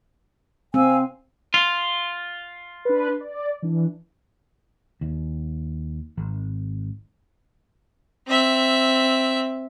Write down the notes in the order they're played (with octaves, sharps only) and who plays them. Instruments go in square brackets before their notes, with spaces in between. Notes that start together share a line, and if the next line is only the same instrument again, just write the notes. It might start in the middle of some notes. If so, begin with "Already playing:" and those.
[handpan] C4 [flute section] F5 G#5 E6
[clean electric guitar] F4
[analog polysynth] D4 B4
D5
E3 D4
[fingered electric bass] D#2
G#1
[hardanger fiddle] C4 E5